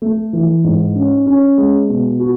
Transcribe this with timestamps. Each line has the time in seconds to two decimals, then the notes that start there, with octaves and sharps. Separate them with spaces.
0.02 A3
0.33 E3
0.64 G#2
0.95 C#4
1.26 C#4
1.58 G#3
1.88 B2
2.20 F#4